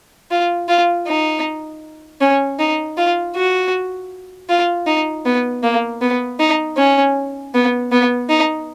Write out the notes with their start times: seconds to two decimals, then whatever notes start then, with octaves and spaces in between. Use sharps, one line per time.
0.31 F4
0.68 F4
1.07 D#4
2.21 C#4
2.59 D#4
2.97 F4
3.36 F#4
4.49 F4
4.87 D#4
5.25 B3
5.63 A#3
6.01 B3
6.40 D#4
6.77 C#4
7.54 B3
7.92 B3
8.30 D#4